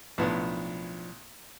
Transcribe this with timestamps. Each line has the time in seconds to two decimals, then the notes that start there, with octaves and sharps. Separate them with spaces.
0.18 B1 A2 F3 B3 D4